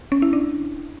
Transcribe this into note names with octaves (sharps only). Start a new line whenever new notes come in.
C#4
E4
D4